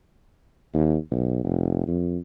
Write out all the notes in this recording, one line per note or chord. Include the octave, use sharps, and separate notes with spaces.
D#2
B1
F1
F2